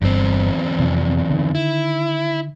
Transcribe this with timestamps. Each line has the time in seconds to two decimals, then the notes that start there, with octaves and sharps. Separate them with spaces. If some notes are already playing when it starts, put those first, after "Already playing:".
0.02 G1 E2 G2 C4
0.79 F2 C3 F3
1.30 D3 D#3
1.55 E4